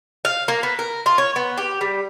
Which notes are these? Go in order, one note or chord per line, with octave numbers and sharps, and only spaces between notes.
F5
A#3
B3
A#4
F4
C#5
B3
G4
G3